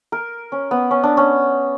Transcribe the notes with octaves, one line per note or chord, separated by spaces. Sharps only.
A#4
C#4
B3
C#4
D4
C#4